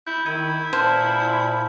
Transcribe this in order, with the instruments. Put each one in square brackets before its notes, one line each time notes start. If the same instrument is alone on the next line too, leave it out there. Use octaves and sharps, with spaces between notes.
[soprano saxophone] E4 [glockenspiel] G6
[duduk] D#3 [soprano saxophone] E4 [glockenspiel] G#6 D#7
[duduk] A#2 [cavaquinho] C5 [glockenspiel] A5 F6 G6